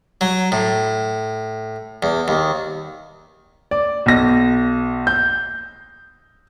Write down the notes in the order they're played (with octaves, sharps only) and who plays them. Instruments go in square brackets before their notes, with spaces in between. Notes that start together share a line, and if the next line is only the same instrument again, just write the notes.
[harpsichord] F#3
A2
E2
D#2
[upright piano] D5
B1 A#6
G6